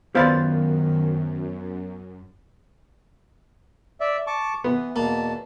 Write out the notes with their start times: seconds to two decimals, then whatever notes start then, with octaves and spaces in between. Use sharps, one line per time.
0.15 F#2 D#3 B3 E4 F4 C5 D5 F5
4.00 D5 E5
4.27 A5 C#6 D6
4.64 E3 B3
4.96 E2 B2 A#3 A5